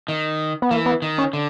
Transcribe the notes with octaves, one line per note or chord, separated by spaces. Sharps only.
D#3
B3
E3 A#3
B3
D#3
C#4
D3